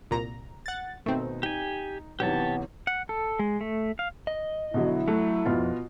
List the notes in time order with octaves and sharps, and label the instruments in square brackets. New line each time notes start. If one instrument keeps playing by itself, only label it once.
[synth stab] C2 A#2 A#5
F#5 A6
[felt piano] B2 D#3 D#4 [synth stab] A3 C4
[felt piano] D#4 [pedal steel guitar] G4 G#5
[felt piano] B1 C3 E3 [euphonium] B3 [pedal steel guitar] G4 C#5 A5
[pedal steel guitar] F#5
A4
G#3
A3
F5
[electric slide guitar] D#5
[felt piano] B2 D3 F#3 [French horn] E4
[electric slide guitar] F#3 [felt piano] A3
[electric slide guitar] F2 [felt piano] B2 B3 F4